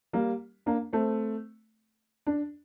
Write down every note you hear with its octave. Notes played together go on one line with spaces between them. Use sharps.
G3 A#3
A#3 D4
A3 C4
D4